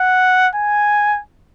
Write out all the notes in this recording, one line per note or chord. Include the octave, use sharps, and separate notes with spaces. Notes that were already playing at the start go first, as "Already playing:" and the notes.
Already playing: F#5
G#5